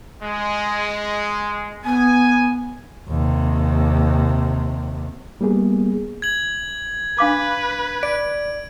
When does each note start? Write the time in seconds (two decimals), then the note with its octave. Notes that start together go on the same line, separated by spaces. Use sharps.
0.23 G#3
1.84 B3 G#5
3.09 D#2 C3
5.41 G3 A#3 B3 G#4
6.22 G#6 F#7
7.19 D4 B4 F5 D6
8.03 D5 D7